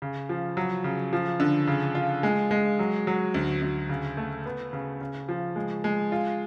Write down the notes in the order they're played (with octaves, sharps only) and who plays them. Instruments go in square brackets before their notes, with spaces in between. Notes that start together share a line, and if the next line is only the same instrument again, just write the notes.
[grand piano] C#3
F3
F#3
C#3
F3
D3
C#3
F4
G#3
G#3
F#3
F#3
D2
D2
C#3
A3
B3
C#3
C#3
F3
G#3
G#3
F4